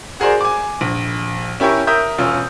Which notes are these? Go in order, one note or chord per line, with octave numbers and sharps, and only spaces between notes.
F#4 G#4 A#4 C5 D5
G#5 D6
A#1
C#4 E4 G4 A#4 C#5
A#4 E5 D#6 G6
E1 C#4 F4 E6